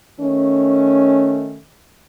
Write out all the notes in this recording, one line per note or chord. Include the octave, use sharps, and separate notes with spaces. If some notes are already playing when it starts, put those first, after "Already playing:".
D#3 A3 C#4